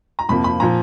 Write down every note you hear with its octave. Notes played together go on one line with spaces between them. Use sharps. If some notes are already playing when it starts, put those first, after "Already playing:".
A#5
F2 C3 F3 A#3 B5
B5
A#2 F3 A#5